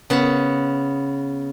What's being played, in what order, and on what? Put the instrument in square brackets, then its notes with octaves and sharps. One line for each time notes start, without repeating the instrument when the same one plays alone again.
[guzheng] C#3 B3